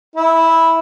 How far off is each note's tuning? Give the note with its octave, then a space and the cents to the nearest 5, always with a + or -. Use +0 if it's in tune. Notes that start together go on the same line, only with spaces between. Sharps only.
E4 -10